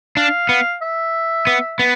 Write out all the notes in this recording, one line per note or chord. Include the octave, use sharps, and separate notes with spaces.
D4 F5
B3
E5
B3
B3